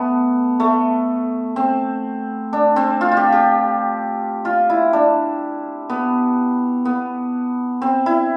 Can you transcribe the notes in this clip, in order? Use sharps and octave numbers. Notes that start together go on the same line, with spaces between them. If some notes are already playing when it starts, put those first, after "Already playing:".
Already playing: A3 B3
A3
C4
D4
C4
F4
F4
G4
G4
F4
E4
D4
B3
B3
C4
E4